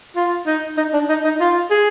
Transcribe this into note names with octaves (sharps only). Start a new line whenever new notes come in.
F4
D#4
D#4
D4
D#4
D#4
F4
G#4